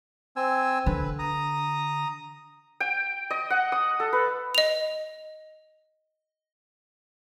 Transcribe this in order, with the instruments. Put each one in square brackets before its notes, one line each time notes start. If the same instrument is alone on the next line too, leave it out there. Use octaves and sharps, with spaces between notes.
[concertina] C4 G#5 E6
[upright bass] D3 [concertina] B4
[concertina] A#5 D#6
[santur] G5
D#5
F#5
D#6
A4
B4
[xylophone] D#5 F7